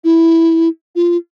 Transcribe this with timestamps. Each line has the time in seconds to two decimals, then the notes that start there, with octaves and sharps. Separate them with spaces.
0.04 E4
0.95 F4